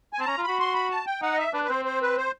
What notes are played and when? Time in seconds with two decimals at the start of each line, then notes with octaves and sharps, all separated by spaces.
0.13 G#5
0.20 C4 A5
0.27 C#4 A#5
0.38 F4
0.44 F#4 B5
0.59 C6
0.74 B5
0.91 A5
1.07 G5
1.22 D#4 F#5
1.33 D#5
1.38 E5
1.53 D4 B4
1.64 B4
1.69 C4 C5
1.85 C5
2.02 B4
2.17 C5